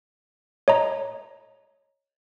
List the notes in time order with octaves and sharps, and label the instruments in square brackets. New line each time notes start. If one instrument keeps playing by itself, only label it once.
[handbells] C#5 D#5 A#5